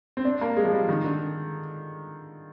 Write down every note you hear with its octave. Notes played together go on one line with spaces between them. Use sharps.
C4
D4
A#3
G#3
F3
G3
D#3
D3